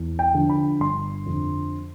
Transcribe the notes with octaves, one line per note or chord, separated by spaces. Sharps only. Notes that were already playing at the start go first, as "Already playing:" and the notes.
Already playing: E2
G5
D3 F3
B5
G1 C6
F2 D3